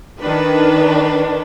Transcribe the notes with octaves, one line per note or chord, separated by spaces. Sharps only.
D#3 D4 B4